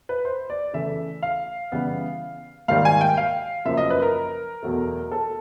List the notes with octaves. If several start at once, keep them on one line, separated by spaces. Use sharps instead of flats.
B4
C5
D5
C#3 E3 A3 E5
F5
C#3 E3 G3 B3
G#2 D#3 G3 A#3 F5
G#5
G5
F5
F#2 C#3 F3 A#3 E5
D#5
B4
A#4
E2 B2 F#3 A3
A4